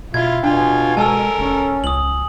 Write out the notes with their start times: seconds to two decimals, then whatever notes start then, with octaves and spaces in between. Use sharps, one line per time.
0.14 B2 E4 F4 G#6
0.43 B2 D4 F4 G#5
0.97 G#3 A4 A#4 G#5 E6
1.39 F1 C#4
1.84 C#2 D#6 F#7